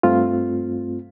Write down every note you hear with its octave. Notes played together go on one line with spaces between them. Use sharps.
G2 A3 C4 F4